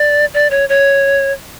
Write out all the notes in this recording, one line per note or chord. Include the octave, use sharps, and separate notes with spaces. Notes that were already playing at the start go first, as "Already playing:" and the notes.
Already playing: D5
D5
C#5
C#5